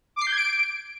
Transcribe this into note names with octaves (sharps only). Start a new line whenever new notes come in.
D6
C7
G6
G#6
D7